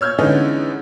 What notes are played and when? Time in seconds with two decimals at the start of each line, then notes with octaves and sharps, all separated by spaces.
0.01 C#5 E6 F6 G6 G#6
0.19 D3 E3 G#3 B3 C#4 D#4